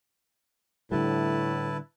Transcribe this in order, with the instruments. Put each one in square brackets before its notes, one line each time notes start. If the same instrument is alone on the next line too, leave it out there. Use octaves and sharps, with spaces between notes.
[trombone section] A2 [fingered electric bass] D3 G3 [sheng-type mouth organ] E4 B4 A5